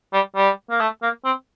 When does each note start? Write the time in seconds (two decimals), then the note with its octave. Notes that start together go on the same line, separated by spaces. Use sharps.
0.13 G3
0.36 G3
0.70 A#3
0.80 A3
1.02 A#3
1.25 C4